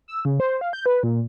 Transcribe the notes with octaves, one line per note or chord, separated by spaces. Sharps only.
E6
C#3
C5
F5
G6
B4
A#2